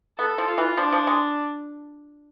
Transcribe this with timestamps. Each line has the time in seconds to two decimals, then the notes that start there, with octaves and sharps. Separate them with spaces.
0.19 B3 A4
0.38 F3
0.48 F4
0.58 E3
0.77 F3 D4
0.92 F3
1.07 G#3